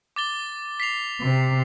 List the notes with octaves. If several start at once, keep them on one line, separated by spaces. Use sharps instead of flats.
D6 A6 G7
B6 C7 F7
C3